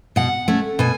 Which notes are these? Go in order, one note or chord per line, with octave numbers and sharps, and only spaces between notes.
B2 F#5
A3 C#4
B2 G#5